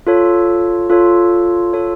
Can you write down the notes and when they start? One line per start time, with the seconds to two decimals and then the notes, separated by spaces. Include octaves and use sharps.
0.07 F4 A4 C#5
0.90 F4 A4 C#5
1.73 F4 A4 C#5